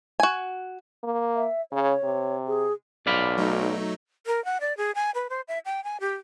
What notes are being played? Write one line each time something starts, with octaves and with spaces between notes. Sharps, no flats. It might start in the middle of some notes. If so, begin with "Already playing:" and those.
F#4 G#5
A#3
E5
C#3 C#5
C3
G#4
B1 D5 F5 B5
F#3 A3 D#4
A#4
F#5
D5
G#4
G#5
B4
C5
E5
G5
G#5
G4